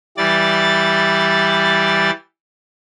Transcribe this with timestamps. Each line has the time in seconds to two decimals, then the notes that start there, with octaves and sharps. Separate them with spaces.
0.17 E3 G3 D5 A6